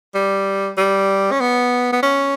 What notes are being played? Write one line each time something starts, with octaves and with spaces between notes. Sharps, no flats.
G3
G3
C#4
B3
B3
C#4